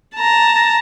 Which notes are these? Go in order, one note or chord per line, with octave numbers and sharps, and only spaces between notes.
A5 A#5